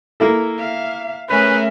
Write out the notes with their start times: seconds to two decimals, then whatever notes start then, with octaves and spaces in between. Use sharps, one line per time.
0.20 A#3 E4 A4
0.58 E5 F5
1.29 A3 C#4 G#4 A#4 B4 E5